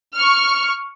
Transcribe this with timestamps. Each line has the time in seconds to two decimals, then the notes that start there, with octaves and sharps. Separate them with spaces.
0.16 C#6 F6